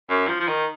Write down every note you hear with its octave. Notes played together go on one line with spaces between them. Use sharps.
F#2
F3
F3
D#3